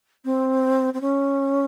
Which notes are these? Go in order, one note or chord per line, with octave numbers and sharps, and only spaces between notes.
C4
C4
C#4